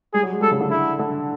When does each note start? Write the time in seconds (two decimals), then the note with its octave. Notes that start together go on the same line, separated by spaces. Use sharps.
0.13 G3 G#4
0.23 F#3
0.33 G#3
0.42 G3 A4
0.51 C#3
0.61 D3
0.71 E4
0.99 D3